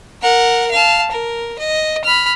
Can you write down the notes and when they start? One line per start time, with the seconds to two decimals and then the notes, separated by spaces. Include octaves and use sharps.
0.22 A#4 F#5
0.71 F5 A5
1.12 A#4
1.59 D#5
2.05 B5 F6